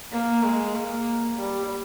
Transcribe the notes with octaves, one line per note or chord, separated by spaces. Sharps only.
A#3
G#3
A#3
G3